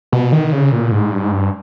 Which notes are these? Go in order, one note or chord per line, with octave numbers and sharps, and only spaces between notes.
B2
D#3
C#3
A#2
G#2
G2
G#2
G2